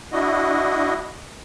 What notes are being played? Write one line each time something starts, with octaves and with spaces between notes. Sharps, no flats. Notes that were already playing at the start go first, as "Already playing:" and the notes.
D4 E4 F#4 D#5